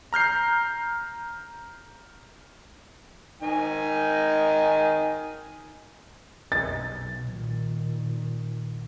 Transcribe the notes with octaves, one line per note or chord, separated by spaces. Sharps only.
A#5 F6 G6 C7
D#3 D#4 G#5
B1 A6
A#2 D#3